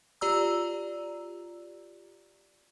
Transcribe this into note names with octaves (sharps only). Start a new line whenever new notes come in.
F4 G4 D5 A#5 E6